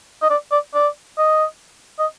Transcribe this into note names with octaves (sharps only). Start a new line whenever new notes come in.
D#5
D5
D5
D5
D#5
D#5